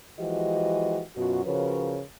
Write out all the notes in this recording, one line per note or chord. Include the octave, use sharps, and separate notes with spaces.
E3 F3 G#3 F#4 G4 D#5
F#2 B2 F4 F#4
C#3 F3 F#4 A#4 B4 C#5